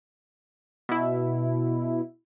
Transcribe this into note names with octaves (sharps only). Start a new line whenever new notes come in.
B2 E4